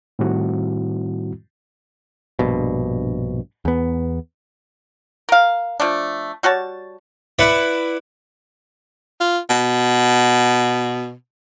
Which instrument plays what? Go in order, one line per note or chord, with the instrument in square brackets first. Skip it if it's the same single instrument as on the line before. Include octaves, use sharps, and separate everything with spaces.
[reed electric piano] A2 D#3 G3 C4 E4 F#4
[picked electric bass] A#1 G2 B2
E2 B3
[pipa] A#4 F5
F3 A3 D4
G3 F#4 C#5 A5
[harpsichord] E4 B4 D5 F#5
[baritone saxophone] F4
B2